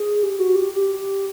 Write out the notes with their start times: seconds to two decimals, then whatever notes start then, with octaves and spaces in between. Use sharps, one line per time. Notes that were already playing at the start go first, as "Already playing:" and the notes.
Already playing: G#4
0.23 G4
0.39 F#4
0.56 G4
0.73 G4